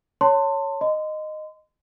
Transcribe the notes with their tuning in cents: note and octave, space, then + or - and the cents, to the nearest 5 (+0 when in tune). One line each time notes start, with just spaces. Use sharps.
C#5 +0 A5 +30 C6 -5
D#5 -10 C6 -30